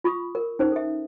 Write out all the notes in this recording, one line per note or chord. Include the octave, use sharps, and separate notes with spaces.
F4 B5 C#6 D#6
A#4
C#4 D#4 C5
A4 E5